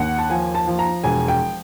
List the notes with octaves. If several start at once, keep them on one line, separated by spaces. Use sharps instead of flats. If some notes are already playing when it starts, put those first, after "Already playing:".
Already playing: D#2 F#5
A5
F3 G#5
A5
F3
A#5
E1 G#5
G5